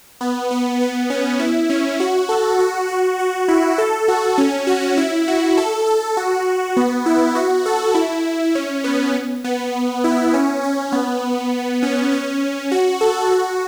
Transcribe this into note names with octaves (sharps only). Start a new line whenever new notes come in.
B3
B3
B3
C#4
E4
C#4
F#4
A4
F#4
F#4
F#4
E4
A4
F#4
C#4
F#4
E4
F#4
A4
A4
F#4
B3
E4
F#4
A4
E4
C#4
B3
B3
E4
C#4
C#4
B3
C#4
C#4
F#4
A4
F#4